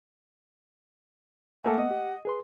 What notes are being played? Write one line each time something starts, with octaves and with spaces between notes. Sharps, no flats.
A3 A#3 A4 F#5 G#5
B3 D#5
G4
G#4 B4 C6